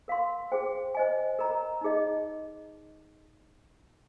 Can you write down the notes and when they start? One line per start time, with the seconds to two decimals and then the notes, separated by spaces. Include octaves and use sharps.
0.08 A#4 F5 C6
0.52 G#4 C5 G5
0.94 C5 D#5 G#5
1.39 A#4 D#5 A#5
1.81 D#4 G#4 D#5